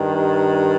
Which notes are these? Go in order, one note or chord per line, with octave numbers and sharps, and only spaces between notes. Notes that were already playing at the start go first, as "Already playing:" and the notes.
Already playing: G2 D#3